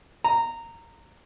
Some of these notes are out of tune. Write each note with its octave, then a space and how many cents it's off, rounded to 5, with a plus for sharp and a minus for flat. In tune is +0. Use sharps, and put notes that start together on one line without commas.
A#5 -15